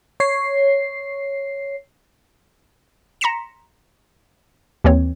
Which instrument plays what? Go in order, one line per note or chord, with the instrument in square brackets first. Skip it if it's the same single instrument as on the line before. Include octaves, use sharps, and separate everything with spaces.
[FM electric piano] C#5 C7
[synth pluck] A#5 C6 A#6 B6 C#7 E7
D#2 E3 C4 C#5